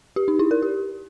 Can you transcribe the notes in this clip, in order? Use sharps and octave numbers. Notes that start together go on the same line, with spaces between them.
G4
D#4
E4
A#4
G4